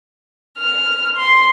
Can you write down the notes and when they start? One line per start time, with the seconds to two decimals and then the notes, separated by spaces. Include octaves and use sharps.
0.59 F6
1.16 C6